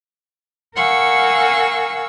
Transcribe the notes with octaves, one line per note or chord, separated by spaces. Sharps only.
A#4 F5 F#5 G#5 C#6 E6